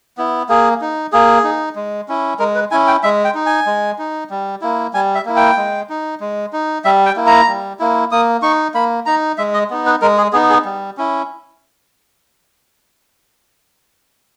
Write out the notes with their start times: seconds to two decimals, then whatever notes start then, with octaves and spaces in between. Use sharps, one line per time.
0.18 B3 E4
0.49 A#3 G#4
0.81 D#4
1.12 A#3 G#4
1.44 D#4
1.76 G#3
2.08 C#4 E4
2.39 G#3 A#4
2.55 B4
2.71 C#4 E4 G#5
2.87 G5
3.03 G#3 E5
3.24 G5
3.34 D#4
3.46 G#5
3.66 G#3
3.98 D#4
4.30 G3
4.62 A#3 E4
4.94 G3 G#5
5.15 E5
5.25 A#3 E4
5.36 G5
5.57 G#3
5.89 D#4
6.20 G#3
6.53 D#4
6.84 G3 E5
7.06 G5
7.16 A#3 E4
7.27 A#5
7.48 G3
7.79 A#3 E4
8.12 A#3 D#6
8.42 D#4 C#6
8.74 A#3 B5
9.06 D#4 A#5
9.38 G#3 E5
9.54 D#5
9.70 B3 D#4
9.86 B4
10.02 G#3 A#4
10.18 G#4
10.33 B3 D#4 G#4
10.50 G#4
10.65 G3
10.97 C#4 E4